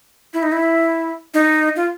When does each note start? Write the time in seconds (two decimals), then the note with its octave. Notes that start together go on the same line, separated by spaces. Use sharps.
0.34 E4
0.43 D#4
0.52 E4
1.34 D#4
1.76 F4